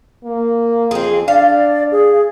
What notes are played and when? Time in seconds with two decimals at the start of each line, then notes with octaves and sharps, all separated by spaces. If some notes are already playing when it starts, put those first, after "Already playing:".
0.24 A#3
0.91 F2 C4 G#4
1.28 D4 D5 F5
1.92 G#4